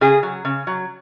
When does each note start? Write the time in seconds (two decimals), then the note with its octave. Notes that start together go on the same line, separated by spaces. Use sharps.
0.01 C#3 G#4
0.23 F#3
0.45 C#3
0.67 F#3